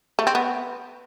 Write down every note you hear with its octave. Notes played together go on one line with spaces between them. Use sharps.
A3
C4
B3